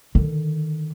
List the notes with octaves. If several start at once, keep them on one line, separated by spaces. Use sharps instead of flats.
D3 D#3